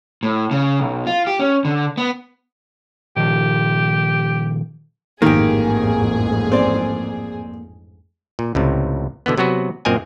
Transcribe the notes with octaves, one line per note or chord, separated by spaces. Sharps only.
A2
C#3
B1
F4
G4
C#4
D3
B3
A#2 D#3 F3 G4
A1 F2 G#2 D#3 A#3 G4 G#4
C4 D5
A#2
C#2 A2 C3
B2 D3 E3 B3
C3 F#3 B3 F#4 B4
F#2 A#2 C4 A#4 D#5 G#5